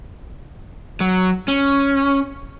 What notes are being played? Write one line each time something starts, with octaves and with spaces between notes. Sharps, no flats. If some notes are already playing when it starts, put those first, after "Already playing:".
F#3
C#4